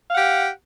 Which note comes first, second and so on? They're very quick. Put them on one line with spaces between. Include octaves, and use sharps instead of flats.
F5 F#5 G4